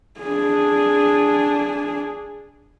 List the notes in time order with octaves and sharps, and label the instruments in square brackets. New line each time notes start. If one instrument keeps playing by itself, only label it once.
[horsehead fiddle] D4 G#4